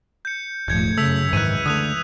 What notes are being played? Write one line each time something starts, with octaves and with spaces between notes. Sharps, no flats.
G6 C#7
D#1 G#2 F3 A3 G6 G#6 C#7
F#2 C#3 A3 E6 B6 F7
C#2 G#2 D#3 E3 F#6 D#7
D3 A3 D#6 F#6 F7